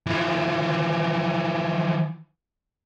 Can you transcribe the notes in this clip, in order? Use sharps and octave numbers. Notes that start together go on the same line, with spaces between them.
E3 F3